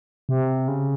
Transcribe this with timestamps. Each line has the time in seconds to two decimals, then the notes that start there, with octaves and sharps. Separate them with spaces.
0.29 C3
0.68 C#3